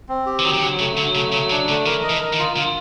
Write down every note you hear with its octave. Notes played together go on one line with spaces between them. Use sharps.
C4
G4
E3
D#3 F#3
D#3
D3 F#3
C#3 A3
D3 F#3
C#3 A3
C#3 F#3
C#3 D4
D3 A3
E3 A#4
D#5
E3
A#4
D#3
F4
D3 F4